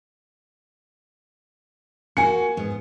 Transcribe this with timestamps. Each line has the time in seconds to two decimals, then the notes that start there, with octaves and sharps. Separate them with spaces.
2.17 A#3 F#4 G#5 C#7
2.57 G#2 B3